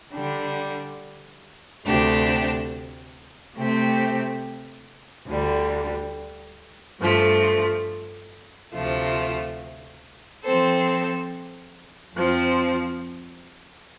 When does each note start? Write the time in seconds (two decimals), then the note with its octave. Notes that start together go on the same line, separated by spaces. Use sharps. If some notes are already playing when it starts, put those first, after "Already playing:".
0.13 D3 G3 D4
1.84 D2 C3 A3 D4 G4
3.57 C3 A3 C4 G4
5.28 D2 D3 G3
7.01 G2 F3 A3
8.72 D2 C3 F3 A3 F4
10.43 F3 C4 A4 C5
12.15 F2 F3 C4